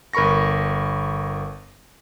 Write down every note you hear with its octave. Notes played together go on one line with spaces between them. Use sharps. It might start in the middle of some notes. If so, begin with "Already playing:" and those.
G1 A#4 B5 C#6 A#6